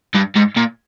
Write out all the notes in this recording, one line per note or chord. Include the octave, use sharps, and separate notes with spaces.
G2
G#2
A#2